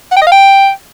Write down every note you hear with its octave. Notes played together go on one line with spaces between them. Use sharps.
F#5
G5
D#5
F5
G5